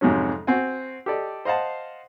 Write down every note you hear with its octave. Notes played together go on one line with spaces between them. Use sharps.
F2 G#2 C3 F#3 C#4
C4 F#4 F#5 G#5
G4 A4 D5 D#5
C5 D#5 F5 F#5 A5